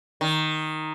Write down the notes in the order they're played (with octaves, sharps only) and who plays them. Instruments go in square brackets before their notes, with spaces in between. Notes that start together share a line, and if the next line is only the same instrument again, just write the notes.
[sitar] D#3